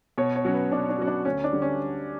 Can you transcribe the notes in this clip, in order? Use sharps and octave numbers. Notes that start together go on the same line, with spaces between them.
B2 C#5
C#5
F#3 C#4 F#4
B4
B2 D4
D4
F#3 C#4 F#4
D4
D2 C#4
D4
D3 G3
C#4